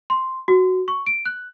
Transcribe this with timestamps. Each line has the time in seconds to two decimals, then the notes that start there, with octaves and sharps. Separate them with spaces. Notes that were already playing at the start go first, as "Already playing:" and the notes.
0.10 C6
0.48 F#4
0.88 C#6
1.06 D7
1.26 F#6